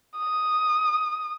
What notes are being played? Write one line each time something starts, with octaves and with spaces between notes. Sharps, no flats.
D#6